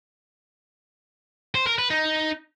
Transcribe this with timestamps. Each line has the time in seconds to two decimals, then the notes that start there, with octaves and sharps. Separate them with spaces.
1.55 C5
1.67 A#4
1.79 B4
1.90 D#4